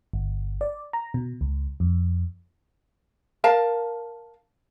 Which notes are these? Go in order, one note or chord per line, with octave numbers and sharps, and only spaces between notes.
G1
D5
A#5
B2
C#2
F2
A#4 F5 A5